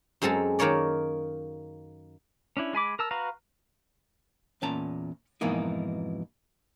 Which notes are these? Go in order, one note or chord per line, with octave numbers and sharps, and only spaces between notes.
F#2 G#3 C4 A4 A#5
D#3 A#3 A#4 C#5 D5
C#4 D4 E4
G#3 G#5 B5 D6
A#4 A5 E6
F#4 B4 F5 A#5
E2 A#2 C#4 A5 A#5
F2 G#2 B2 E3 A#3 D#4